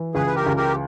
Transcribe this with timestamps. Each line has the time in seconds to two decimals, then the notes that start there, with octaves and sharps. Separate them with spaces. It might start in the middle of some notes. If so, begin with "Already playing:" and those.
Already playing: E3
0.14 C#2 G#4 B4
0.26 B4
0.35 G4 A#4
0.46 C#2
0.57 G4 A#4